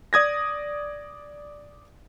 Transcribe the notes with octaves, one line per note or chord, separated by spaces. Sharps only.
D5 D#6 G#6 A#6